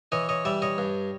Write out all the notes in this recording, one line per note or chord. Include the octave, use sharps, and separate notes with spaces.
E3 C#5 D#5
C#5 D#5
G3 D5 E5
C#5 D#5
G2